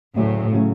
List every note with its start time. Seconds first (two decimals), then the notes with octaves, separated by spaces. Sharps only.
0.16 D2 A2 C#3 F#3 A3 C#4
0.52 C#3 F#3 A3 C#4